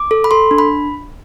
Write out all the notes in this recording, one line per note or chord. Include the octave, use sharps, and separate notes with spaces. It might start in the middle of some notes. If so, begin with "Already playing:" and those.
Already playing: D6
A4
B5
A4 C6
D4
B5